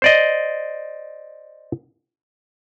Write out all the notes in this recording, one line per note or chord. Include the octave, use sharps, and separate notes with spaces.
C5 D5 D#5